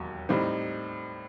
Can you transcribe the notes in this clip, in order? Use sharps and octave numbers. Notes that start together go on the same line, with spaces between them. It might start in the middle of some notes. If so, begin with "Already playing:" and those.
Already playing: E1 D#2 F#3
A2 G3 C4 D#4